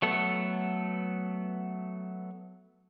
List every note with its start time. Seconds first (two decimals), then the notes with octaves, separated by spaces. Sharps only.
0.02 F#3 A3 B3 A4